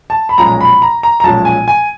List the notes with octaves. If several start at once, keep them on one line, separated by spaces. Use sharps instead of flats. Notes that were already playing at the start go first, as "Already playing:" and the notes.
A5
B5
B1 A#2 F3 G#3 C#4 A#5
B5
A#5
A#5
A#5
B1 A#2 F3 G#3 C#4 A5
G#5
G#5